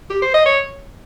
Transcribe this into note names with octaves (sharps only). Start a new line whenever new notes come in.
G4
C5
D#5
C#5